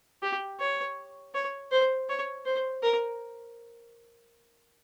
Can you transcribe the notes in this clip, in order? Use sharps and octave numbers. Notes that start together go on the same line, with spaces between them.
G4
C#5
C#5
C5
C#5
C5
A#4